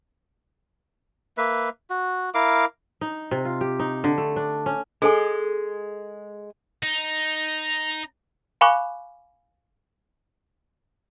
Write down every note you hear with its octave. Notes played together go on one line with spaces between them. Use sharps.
A#3 B4 E5
F#4
E4 A#4 F5 D6
D#4
C3
F4
G4
D#4
D3
A3
D4
C#4
G#3 G#4 A4 G#5
D#4
F5 G#5 B5 C#6 D6 F#6